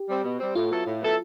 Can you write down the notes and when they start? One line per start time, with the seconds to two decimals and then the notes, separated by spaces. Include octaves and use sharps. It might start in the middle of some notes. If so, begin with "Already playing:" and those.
Already playing: G4
0.09 G3 C4
0.24 B2
0.39 G3 C4
0.55 A2 F4
0.71 F#3 B3 E4 A4
0.86 A2
1.02 F#3 B3 E4 A4